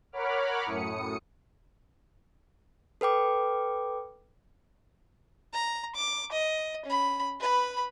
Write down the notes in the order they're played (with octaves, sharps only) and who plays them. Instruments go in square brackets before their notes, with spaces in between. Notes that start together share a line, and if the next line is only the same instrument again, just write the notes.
[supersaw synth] A#4 C#5 F#5 B5 D6 F6
F#2 A2 D#6 C#7
[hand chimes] A4 B4 G5 D6
[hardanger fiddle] A#5
D6
D#5
C#4 B5
B4 B5